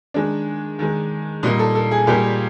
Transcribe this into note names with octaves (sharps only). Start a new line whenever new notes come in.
D#3 G#3 D4
D#3 G#3
A#2 G3 A#3 D#4
A4
A4
G#4
A#2 G3 A#3 G4